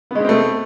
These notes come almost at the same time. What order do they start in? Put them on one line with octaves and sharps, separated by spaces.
B3 G#3 B2 C4 A3